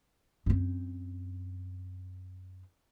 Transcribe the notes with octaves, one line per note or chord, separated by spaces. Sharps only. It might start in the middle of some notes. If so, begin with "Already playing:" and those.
F#2 C4